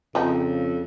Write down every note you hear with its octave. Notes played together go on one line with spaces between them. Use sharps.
F2 C#3 F3 C4 D#4